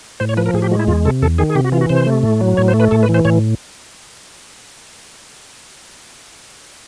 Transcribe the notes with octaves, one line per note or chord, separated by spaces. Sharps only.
A2 C5
C#5
F3 B4
A#4
A2 G#4
G4
G#3 F#4
E4
E2 F4
C3 A4
E2 A4
D#3 G#4
G#4
C3 G4
F#4
E3 F4
F#4
C3 C5
A3
A2
F#3
A2 C#5
C5
A3
B4
A2 A4
B4
E3
C5
A2 C#5